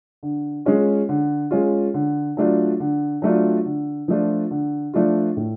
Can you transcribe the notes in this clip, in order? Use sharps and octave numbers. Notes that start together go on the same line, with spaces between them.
D3
G#3 C#4 F4
D3
G#3 C#4 F4
D3
F#3 A3 D4 F4
D3
F#3 A3 D4 F4
D3
F3 A3 D4 F4
D3
F3 A3 D4 F4
A2